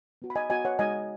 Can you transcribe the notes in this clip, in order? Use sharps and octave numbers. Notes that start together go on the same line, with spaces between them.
B3 F#4
B5
D#5 G#5
B3 F#4 D#5 G#5
C#5 F#5
G#3 D#4 F#4 D#5 G#5